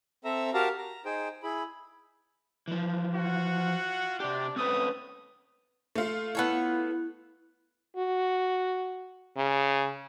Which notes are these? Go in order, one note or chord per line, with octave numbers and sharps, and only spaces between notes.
C4 A4 E5 A#5 E6
F#4 G4 A#4 F5 A5 A#5
A#5
D#4 G#4 C5 G5
E4 G#4 B5
E3 F3
F4 F#4 F#5
C3 D4 G4 D5
A3 C4 C#4 B4 D#6
A3 F4
B3 E4 A4 C#5
F#4
C#3